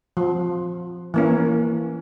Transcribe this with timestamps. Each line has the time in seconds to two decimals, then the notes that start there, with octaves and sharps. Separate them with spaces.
0.17 F3
1.14 E3 A#3 C#4